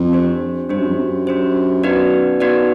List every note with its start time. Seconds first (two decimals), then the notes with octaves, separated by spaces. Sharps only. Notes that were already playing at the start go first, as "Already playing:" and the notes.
Already playing: F2
0.12 D4 G4 C5
0.69 G2 D4 G4 C5
0.78 F#2
0.87 F2
0.96 F#2
1.27 D4 G4 C5
1.83 B3 D#4 F#4 B4 D5
2.40 B3 D#4 F#4 B4 D5